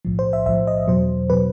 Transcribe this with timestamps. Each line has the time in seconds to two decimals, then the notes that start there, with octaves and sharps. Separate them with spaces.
0.05 B1 A2 F3
0.19 C5
0.33 E5
0.46 B1 A2 F3 E5
0.67 D#5
0.87 E2 B2 F#3 C5
1.29 B2 F#3 B4